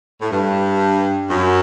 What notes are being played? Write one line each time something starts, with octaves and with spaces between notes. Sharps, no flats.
A2
G2
F#2